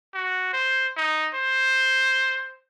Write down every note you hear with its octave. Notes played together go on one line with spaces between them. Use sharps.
F#4
C5
D#4
C5